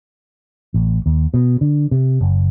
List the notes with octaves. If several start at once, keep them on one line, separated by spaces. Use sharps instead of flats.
A1
D#2
B2
D3
C3
F#1